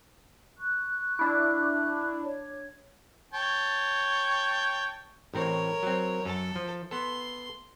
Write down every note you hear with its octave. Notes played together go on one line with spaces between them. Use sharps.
C#6 F#6
D4 E4
D4 C#5
C#5 G5 A5
A1 A2 C4 A#4 C#5
F#3 C4
F#2 A4 A5
F3
B3 A4 C6